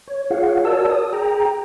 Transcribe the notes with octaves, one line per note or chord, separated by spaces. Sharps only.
C#5
F4 G#4 C#5 F5 F#5
F#4 A#4 C#5 D5 A5 E6
D#6
G#4 G5 A#5